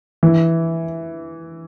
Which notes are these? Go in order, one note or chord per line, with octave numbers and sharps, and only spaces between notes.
E3